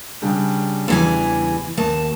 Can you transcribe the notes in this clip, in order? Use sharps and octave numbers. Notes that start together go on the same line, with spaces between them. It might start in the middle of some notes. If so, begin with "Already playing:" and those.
C#3 G3 D4
E2 E3 G#5
D#2 A5